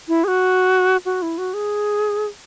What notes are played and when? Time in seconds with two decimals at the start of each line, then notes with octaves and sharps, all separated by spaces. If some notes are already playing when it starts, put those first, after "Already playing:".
0.08 E4
0.24 G#4
0.28 F#4
1.05 F#4
1.22 E4
1.38 F#4
1.54 G#4